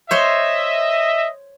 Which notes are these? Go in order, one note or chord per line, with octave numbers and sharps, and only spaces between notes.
C5 C#5 D#5 E5 C6